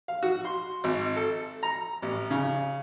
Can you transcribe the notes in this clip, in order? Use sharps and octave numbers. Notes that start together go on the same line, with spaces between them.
F5
F#4
C6
G#1
A4
A#5
A1
C#3